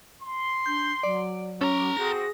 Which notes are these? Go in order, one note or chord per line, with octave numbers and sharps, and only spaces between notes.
C6
D4 G6
F#3 D5
C#4 A4 A#5 D6
C4 F#4 G#4 A#6